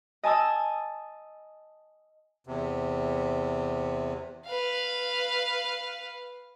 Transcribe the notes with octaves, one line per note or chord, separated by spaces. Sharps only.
D#5 G#5 A5 D#6 E6
E2 C3
B4 F5